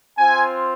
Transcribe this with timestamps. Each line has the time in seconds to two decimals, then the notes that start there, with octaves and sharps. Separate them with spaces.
0.18 C4 F4 G#5